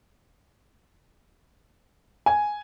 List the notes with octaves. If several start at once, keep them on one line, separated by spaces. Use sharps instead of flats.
G#5